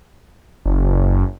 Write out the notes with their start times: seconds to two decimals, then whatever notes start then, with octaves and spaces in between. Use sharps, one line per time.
0.66 F#1